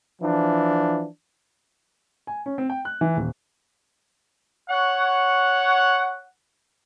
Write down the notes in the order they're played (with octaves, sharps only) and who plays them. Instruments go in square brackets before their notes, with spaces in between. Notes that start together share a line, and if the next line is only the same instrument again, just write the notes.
[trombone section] E3 F3 D4
[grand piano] G#5
C#4
C4
G5
F#6
E3
D#1
[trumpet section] C#5 F#5